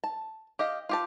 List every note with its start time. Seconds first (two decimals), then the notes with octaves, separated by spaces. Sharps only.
0.04 A5
0.59 G4 D#5 F5
0.89 F4 G4 A5